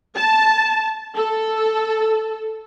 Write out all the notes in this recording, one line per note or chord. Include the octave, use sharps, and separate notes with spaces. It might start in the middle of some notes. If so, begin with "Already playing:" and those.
A5
A4